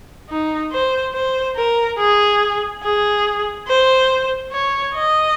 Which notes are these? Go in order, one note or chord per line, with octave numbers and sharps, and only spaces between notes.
D#4
C5
C5
A#4
G#4
G#4
C5
C#5
D#5